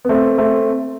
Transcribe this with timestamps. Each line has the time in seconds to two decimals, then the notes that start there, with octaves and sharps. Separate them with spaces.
0.05 B3
0.09 A3 C4
0.38 A3 C4